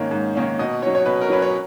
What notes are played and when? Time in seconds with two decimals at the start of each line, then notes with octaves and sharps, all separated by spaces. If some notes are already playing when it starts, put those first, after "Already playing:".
Already playing: G#2 D#3 A#3 C#4
0.11 G#2
0.35 D#3 A#3 C#4
0.59 B2 D#5
0.82 C#4 C#5
0.86 F#3
0.95 C#5
1.06 B2 B4
1.21 A#4
1.30 F#3 C#4 B4
1.42 C#5